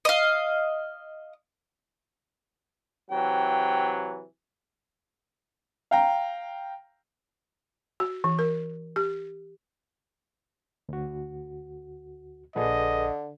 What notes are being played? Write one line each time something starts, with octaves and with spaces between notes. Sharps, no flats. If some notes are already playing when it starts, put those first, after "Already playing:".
D#5 F5
C3 E3 F#3 G5
F5 G5 A#5
F#4
E3
A#4
G4
D2 F#4
A#1 D3 G#4 A4 B4 D#5